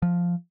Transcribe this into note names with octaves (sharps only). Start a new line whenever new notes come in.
F3